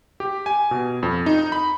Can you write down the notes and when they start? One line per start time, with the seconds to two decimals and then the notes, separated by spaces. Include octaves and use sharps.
0.20 G4
0.46 G#5
0.71 B2
1.03 F2
1.26 D#4
1.52 B5